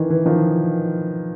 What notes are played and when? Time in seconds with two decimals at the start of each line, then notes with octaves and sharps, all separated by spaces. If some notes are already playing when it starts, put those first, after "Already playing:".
Already playing: D#3 E3
0.10 E3
0.25 D#3 F3